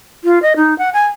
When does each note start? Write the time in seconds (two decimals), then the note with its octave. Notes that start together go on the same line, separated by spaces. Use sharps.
0.24 F4
0.42 D#5
0.56 D#4
0.79 F#5
0.94 G#5